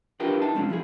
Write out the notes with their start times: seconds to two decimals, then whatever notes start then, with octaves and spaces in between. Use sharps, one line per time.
0.20 D4 E4 F4 G4 A#4 B4
0.42 D#4 A5
0.54 F2 G#2 C3 G#3 A3 C#4
0.69 C#2 F3 E4 G#4